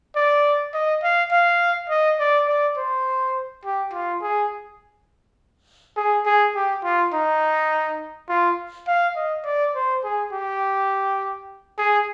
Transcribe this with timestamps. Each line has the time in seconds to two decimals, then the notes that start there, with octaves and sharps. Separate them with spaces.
0.16 D5
0.74 D#5
1.03 F5
1.32 F5
1.90 D#5
2.20 D5
2.48 D5
2.77 C5
3.65 G4
3.93 F4
4.22 G#4
5.96 G#4
6.26 G#4
6.55 G4
6.84 F4
7.13 D#4
8.29 F4
8.88 F5
9.16 D#5
9.45 D5
9.75 C5
10.04 G#4
10.33 G4
11.78 G#4